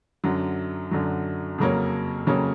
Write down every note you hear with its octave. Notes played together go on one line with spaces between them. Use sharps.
F#2 D3 F#3
F#2 D3 F#3
F2 C#3 F#3 A#3 C#4
F2 C#3 F#3 A#3 C#4